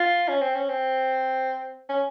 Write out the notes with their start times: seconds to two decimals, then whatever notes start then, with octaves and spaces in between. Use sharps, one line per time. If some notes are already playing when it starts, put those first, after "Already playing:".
Already playing: F4
0.28 C#4
0.41 C4
0.55 C#4
0.69 C4
1.89 C#4